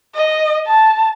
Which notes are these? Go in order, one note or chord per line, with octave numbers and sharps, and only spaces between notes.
D#5
A5